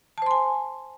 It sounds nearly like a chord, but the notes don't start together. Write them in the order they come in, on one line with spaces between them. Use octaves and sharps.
A5 C5 C6 G#5